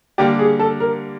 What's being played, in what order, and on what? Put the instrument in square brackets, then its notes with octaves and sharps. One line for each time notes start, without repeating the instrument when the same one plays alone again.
[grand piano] D3 G3 A#3 D4 [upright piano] G4
[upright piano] G#4
A4
A#4